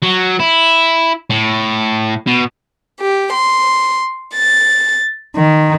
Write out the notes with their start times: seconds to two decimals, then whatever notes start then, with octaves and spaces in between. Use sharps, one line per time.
0.02 F#3
0.40 E4
1.30 A2
2.27 B2
3.00 G4
3.33 C6
4.34 A6
5.34 D#3